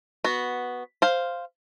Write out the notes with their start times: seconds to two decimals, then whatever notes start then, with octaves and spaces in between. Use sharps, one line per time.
0.24 B3 F#4
1.02 C5 F5